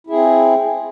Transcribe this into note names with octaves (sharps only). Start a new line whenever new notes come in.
C4 E4 G#4